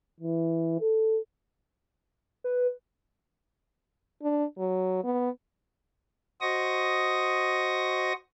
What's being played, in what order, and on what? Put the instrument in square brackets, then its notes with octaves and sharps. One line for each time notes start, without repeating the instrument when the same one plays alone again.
[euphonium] E3
A4
[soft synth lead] B4
[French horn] D4
F#3
B3
[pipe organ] F#4 C5 D#5 C#6 D#6 A#6